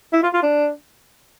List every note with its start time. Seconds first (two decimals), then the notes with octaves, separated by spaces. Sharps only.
0.13 E4
0.23 F4
0.34 F4
0.43 D4